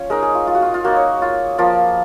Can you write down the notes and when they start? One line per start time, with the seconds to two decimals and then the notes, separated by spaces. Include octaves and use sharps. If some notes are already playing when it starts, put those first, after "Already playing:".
Already playing: C#4 F4 C#5
0.10 G#3 D#4 A#4
0.23 G#4
0.35 F4
0.47 F4
0.54 F#4
0.62 F4
0.74 F4
0.84 A#3 D#4 F#4
0.96 C#5
1.22 F4
1.58 F3 A#3 F4